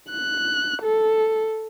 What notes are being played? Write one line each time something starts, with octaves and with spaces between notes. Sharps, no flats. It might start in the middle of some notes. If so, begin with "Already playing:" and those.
F#6
A4